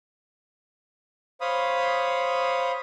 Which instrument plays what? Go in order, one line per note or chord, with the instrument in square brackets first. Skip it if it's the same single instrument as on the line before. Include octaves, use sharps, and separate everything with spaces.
[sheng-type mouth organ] C5 C#5 F5 B5 D#6